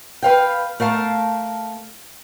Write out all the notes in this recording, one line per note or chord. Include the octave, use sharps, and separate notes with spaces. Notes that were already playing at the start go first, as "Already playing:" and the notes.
B4 F5 G5
A3 A#4 F5 A5